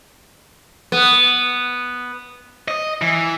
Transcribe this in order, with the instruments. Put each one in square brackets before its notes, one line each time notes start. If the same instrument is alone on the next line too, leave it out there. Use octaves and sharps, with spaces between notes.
[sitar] B3
[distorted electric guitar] D#5
E3